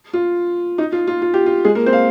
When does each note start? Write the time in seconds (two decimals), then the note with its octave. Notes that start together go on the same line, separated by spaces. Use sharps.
0.13 F4
0.78 D#4
0.92 F4
1.07 F4
1.22 F4
1.34 G4
1.46 F4
1.65 G#3 G#4
1.75 A#3 A#4
1.86 C4 C5
1.93 F5